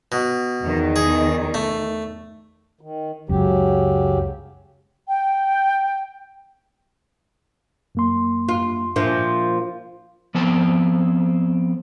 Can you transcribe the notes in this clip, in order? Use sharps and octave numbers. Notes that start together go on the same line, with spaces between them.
B2
E2 D#3
G#4
A3
D#3
C#2 F#2 C#3 F#3 G4
G5
F#2 A#3 C6
F4
A#2 F3 D4 E5
F3 B3 C4 A5